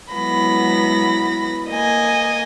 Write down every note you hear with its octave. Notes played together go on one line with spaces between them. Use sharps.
F#3 G#3 B3 E4 B5 A#6
A#3 D#5 G#5